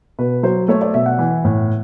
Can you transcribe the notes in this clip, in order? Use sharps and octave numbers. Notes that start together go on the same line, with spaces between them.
B2 B4
F#3 C5
A3 C#5
D5
B2 E5
F#5
E3
A2